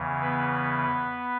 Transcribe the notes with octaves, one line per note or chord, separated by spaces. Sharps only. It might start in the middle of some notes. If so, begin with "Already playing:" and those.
Already playing: E2 C#3 E3
B3 B4